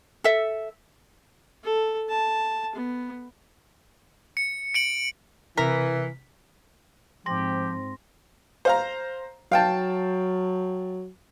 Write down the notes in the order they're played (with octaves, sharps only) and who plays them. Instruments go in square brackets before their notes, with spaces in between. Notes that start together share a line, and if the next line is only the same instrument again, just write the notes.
[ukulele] A4 E5
[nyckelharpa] A4
A5
B3
[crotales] C#7
C#7 D7 F#7
[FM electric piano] C3 B6 [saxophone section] E3 [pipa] A#4
[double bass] G#2 C4 [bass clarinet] F3 [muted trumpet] G4 [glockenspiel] C6 A#6
[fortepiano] C5 F5 A#5
[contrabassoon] F#3 [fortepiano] F5 G5 A5